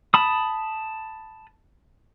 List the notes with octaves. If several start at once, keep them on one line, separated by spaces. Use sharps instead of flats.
A5 B5 D#6